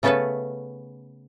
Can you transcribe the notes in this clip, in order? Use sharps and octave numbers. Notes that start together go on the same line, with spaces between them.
C#3 A3 B3 C#4 A4 B4